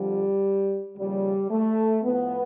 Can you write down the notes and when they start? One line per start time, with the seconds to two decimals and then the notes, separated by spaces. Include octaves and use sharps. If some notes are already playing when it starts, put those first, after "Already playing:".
Already playing: F2 D3 F3 G3
0.96 D#2 C#3 F3 G3
1.50 A3
2.04 A2 F3 B3